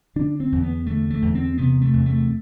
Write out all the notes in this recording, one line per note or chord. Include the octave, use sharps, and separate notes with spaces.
D3 D4
C4
E2
B3
D3 A3
A3
E2
C4
C3 B3
A3
E2
A3